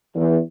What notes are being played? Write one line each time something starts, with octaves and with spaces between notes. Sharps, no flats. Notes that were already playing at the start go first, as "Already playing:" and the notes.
E2